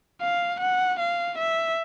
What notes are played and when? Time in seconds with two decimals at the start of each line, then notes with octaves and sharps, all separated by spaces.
0.22 F5
0.61 F#5
1.00 F5
1.38 E5